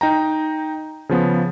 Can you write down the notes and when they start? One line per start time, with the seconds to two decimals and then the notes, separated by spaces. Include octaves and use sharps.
0.01 D#4 G5 A#5
1.09 C#3 F3 B3